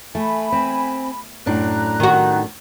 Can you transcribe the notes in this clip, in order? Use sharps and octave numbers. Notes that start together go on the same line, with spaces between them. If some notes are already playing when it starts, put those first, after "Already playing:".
A3 G#5 B5
C4
F#2 A2 D4 A#5 F#6
D#3 F#4